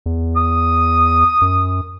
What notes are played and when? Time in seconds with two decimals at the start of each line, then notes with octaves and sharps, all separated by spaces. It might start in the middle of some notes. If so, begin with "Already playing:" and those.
0.06 E2
0.36 D#6
1.42 F#2